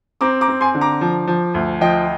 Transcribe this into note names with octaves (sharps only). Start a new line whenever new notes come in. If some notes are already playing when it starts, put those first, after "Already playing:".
C4 A#5 D6
A#5 D6
C4
G#5 C6
D3
A#5 D6
F3
F3
D2
F3 D#5 G5